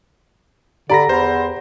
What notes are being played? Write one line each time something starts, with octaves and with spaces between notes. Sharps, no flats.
D3 D4 G4 D5 A#5 B5 A#6
E2 B4 C5 B5